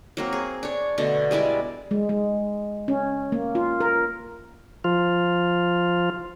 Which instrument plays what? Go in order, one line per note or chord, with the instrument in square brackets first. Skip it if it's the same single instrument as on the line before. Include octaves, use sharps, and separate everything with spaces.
[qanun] F#3 A#3 C4
G#4
D4 C#5
B2 D3 A3
G3 G#3 E4 D5
[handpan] G#3
G#3
C#4
A#3
F4
A#4
[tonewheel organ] F3 F4